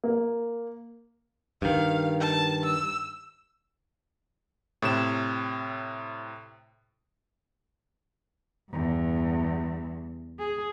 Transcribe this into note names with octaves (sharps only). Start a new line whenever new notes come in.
A#3
G2 D#3 F5
A5
E6
A2 C3 E7
E2 G2
G#4